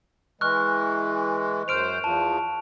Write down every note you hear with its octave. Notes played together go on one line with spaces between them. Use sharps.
E3 G#3 C#6 F6 F#6
F#2 C5 F6 D7 F7
E2 F3 A5